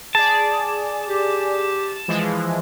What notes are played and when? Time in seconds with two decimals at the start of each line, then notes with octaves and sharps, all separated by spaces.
0.15 G#4 D5 A5
1.09 G4
2.08 E3 F3 G#3